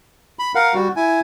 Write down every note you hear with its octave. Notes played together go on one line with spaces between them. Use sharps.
B5
A#4 F5 F#5
G3 F#4
E4 G#5